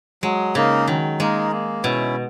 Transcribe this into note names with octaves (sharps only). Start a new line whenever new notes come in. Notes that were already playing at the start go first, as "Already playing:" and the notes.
F#3 G#3
C#3 A#3 D#4 A#4
D#3 F#3
G#3 A#3 D#4 A#4
A#3
B2 C#4 E4